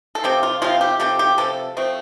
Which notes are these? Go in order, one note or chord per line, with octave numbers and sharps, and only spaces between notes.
A4
C3 F3 A3 C4 G4
F4
C3 F3 A3 C4 F4
G4
C3 F3 A3 C4 G4
G4
C3 F3 A3 C4 A4
F3 A3 C4